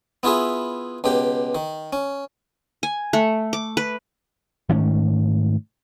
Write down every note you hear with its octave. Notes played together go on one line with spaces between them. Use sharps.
B3 E4 F4 G#4 E5
C#2 B2 G4
D#3
C#4
G#5
A3
D6
B4
G#2 D#3 A3 C#4